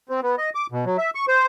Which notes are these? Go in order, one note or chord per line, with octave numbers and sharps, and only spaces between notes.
C4
B3
D#5
D6
B2
F#3
E5
C#6
C5